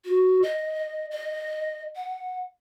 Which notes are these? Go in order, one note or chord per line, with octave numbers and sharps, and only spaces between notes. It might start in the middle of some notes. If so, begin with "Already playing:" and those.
F#4
D#5
D#5
F#5